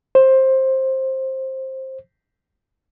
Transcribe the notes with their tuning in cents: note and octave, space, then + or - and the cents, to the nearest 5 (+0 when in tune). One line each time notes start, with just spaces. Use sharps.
C5 +15